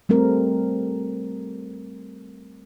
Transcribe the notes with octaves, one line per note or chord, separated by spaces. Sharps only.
G3 A3 C4 A#4